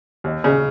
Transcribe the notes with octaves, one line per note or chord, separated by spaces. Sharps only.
D#2
C#3